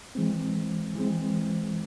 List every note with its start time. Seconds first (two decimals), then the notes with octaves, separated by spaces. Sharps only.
0.15 E3 G#3 C4
0.95 E3 G#3 C4